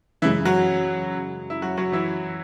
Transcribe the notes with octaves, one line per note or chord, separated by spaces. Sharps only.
F#2 C#3 E3 G#3 C#4 E4
F#3 F#4
E4
F#3 F#4
F#3 F#4
E3 E4